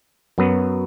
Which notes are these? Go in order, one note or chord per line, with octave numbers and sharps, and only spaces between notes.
F#2 F#3 B3